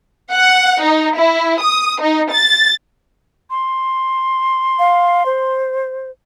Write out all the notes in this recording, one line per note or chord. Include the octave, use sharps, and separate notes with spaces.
F#5
D#4
E4
D#6
D#4
A6
C6
F5
C5